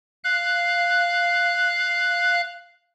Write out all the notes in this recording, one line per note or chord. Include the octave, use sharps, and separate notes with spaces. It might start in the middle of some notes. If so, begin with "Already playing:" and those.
F5 F#6